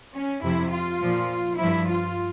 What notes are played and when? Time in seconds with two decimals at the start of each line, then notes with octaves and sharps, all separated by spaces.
0.13 C#4
0.42 F2 C3 F3 E4
0.71 F4
1.01 A#2 F3
1.58 G2 F3 E4
1.88 F4